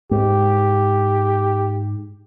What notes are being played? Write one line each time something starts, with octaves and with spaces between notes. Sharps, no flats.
G#2 G4